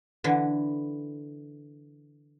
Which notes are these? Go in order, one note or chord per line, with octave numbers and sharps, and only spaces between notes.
D3 E3